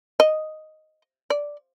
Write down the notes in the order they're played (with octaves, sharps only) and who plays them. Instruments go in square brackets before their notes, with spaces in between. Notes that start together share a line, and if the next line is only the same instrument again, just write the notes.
[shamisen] D#5
D5